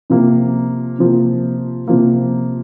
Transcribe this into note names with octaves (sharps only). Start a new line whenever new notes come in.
C3 F3 A#3
C3 F3 A#3
C3 F3 A#3